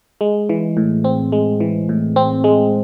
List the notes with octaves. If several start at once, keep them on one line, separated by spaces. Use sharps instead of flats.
G#3
E3
A2
C4
G#3
E3
A2
C4
G#3